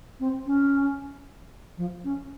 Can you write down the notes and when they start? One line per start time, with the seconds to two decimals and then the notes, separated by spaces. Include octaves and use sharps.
0.20 C4
0.46 C#4
1.78 F3
2.04 C#4